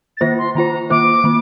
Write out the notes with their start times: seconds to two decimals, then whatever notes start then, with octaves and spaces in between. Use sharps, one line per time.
0.17 A6
0.21 D#3 A#3 F4 C5 A#6
0.38 C6
0.55 D#3 A#3 F4 C5 A#5
0.90 D#3 A#3 F4 C5 D6
1.24 D#3 A#3